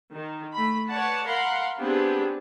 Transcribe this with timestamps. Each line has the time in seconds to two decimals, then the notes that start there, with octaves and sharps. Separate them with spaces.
0.13 D#3
0.53 A3 B5
0.89 B4 C#5 D5 F#5 A5
1.25 A#4 F5 F#5 B5 C6
1.80 B3 C4 D4 G4 G#4 B4